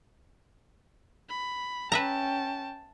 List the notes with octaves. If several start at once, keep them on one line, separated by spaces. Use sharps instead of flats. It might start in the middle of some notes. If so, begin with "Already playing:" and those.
B5
C#4 B4 E5 G5 A5 A#5